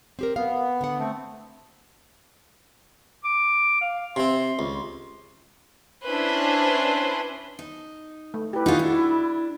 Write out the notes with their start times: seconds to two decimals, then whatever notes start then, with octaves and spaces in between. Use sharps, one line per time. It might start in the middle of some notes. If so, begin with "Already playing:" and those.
0.19 C4 G4 A#4
0.36 B3 F5
0.81 D3 F#5
0.99 A3 C4
3.24 D6
3.81 F5
4.16 C3 C4 C6
4.59 C#2
6.05 C#4 D4 E4 B4 C5
7.59 D#4
8.34 A3
8.53 E4 G4 B4
8.66 D#4 F4 F#4 G#4
8.79 D4